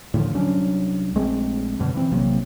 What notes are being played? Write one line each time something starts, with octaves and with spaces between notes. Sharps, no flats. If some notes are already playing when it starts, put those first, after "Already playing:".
A2 D3 E3 F3
C2 F#3 C#4 D4
A#1 G#3 A3 C4
F#2 B2 D3
E3 C4
A#1 C3 F#3 A#3